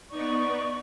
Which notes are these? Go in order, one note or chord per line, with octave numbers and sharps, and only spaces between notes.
B3 D#4 D5 C#6